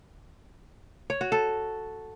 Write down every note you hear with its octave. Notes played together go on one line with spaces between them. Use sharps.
C#5
F#4
A4